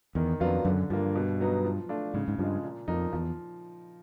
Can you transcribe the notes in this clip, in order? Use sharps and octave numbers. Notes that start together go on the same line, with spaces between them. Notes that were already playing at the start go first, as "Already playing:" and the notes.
E2 D#3
F2 F#3 B3 D4 F4
F#2 D3
G2 F3 A#3
B2
F#3 B3 D#4
F3
A3 D4 F4
G#2 C#3
G#2
G2 F3 G#3
A#2
F2 F3 A#3 D#4
E2 F3